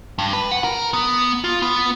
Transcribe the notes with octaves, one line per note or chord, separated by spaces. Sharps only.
G2
B4
F#5
A#4
B3
F4
B3